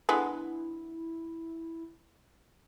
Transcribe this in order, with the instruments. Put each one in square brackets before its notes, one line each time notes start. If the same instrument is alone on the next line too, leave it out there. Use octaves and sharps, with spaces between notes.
[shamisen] D3 G#3 B3 [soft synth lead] E4